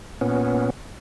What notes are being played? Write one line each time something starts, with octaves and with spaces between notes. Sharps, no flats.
A#2 B3 C#4